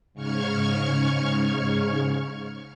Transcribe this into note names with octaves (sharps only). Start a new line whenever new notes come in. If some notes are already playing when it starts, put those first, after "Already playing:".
G#2 C#3 C#6 F6 G#6